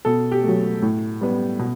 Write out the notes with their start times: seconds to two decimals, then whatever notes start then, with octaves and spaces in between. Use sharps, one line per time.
0.05 B2 A4
0.32 G4
0.44 F#3 A3
0.82 A2
1.21 G3 B3
1.59 B2